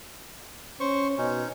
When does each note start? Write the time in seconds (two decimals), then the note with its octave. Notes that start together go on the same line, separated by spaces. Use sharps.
0.80 C#4 C5 C#6
1.18 B2 C#4 D#4